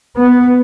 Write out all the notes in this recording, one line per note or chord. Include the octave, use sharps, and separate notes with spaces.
B3